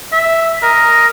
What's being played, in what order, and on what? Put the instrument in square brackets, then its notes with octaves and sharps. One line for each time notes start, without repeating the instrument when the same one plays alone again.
[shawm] E5
[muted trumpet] A#4 [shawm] D#5